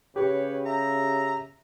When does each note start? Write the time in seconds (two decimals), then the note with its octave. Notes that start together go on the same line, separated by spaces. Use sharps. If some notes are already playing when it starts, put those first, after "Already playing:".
0.16 C#3 G4 B4 C#5
0.66 E5 A#5